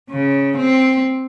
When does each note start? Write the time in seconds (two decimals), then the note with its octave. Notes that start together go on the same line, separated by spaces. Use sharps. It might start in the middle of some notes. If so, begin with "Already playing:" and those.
0.10 C#3
0.57 C4